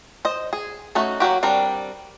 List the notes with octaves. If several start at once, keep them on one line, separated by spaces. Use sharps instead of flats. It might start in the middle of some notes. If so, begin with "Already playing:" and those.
C5 D#5
G#4
A3 C#4 D#4 F#4
F#3 A#3 F#4 G4
G3 C4 D4 A#4